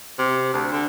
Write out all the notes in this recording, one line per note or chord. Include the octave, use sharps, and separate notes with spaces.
C3
D2
D3